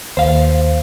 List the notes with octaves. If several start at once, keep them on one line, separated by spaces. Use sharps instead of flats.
D#2 C5 F5